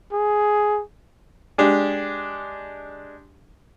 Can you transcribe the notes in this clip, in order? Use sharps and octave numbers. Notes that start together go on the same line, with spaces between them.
G#4
G#3 D4 G4